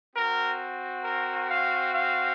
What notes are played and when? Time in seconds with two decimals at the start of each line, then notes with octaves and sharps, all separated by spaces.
0.15 C4 F#4 A#4
1.04 A#4
1.48 F5
1.93 F5